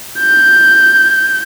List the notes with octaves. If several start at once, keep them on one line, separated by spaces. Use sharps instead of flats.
G6